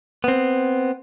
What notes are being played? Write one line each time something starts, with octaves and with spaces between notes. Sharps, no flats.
B3 C4